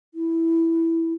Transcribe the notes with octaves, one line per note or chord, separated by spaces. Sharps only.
E4